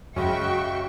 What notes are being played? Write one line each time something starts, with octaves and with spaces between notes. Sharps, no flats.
F#2 C#3 G#3 C#4 F#4 E5 G5 C#6